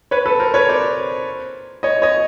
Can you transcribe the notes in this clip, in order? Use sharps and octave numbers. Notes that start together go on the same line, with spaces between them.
B4 C#5
A4 B4
A#4 C5
B4 C#5
C5 D5
C#5 D#5
C#5 D#5